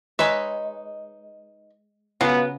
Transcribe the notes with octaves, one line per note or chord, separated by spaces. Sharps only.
G#3 D#4 B4 C#5 E5
C#3 F#3 B3 F4 F#5